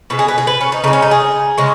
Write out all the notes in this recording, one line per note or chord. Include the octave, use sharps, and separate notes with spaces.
B2 G#3 B4
G#4
B4
G#4
B4
C#4
D#4
C#3 G#3 D#4
C#4
D#4
G#4
C#3 G#3